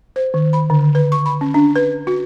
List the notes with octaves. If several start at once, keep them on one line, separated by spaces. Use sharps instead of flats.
C5
D#3
B5
D3
B4
C#6
B5
C#4
D4
B4
F#4